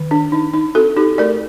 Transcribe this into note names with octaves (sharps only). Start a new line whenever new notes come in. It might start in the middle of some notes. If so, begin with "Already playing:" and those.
Already playing: D#3
D4
D#3 D#4
D#4
C4 F#4 A4
D#4 G4
A3 A#4 D5